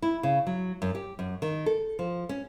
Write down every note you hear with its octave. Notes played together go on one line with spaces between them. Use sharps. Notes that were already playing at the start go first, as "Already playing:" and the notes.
E4
C#3
F#3
F#2
G4
F#2
D#3
A4
F3
C#4